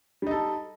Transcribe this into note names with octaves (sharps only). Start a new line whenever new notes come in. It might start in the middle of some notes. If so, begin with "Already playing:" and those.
G3 D#4 A4